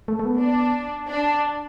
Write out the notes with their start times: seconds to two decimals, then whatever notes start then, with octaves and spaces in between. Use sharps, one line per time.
0.08 A3
0.19 A3
0.25 B3
0.41 D4
1.09 D4